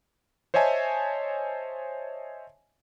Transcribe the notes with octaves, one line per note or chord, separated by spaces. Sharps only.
C5 C#5 D#5 E5 G#5 A5